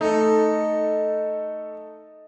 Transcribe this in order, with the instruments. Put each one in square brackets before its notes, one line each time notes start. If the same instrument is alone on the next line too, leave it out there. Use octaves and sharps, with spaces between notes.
[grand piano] A3 A4 [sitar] D#4